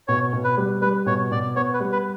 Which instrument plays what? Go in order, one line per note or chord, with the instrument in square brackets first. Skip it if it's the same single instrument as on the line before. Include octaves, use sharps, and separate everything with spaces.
[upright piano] B2 [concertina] C#5
[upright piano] B2
[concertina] B4
[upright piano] G3
[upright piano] G3 [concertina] B4
[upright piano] B2 [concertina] C#5
[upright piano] B2 [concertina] D5
[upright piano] B3 [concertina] C#5
[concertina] B4
[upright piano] G3
[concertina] B4